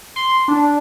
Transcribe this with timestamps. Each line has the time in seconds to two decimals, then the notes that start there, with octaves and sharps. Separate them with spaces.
0.16 C6
0.48 D4